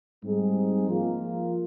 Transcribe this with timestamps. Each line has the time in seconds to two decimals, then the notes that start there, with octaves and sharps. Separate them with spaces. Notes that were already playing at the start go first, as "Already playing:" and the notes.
0.23 G#2 G3 C4 D#4 G#4
0.88 F3 A#3 F4 A#4